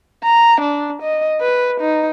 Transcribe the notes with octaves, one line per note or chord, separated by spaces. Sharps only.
A#5
D4
D#5
B4
D#4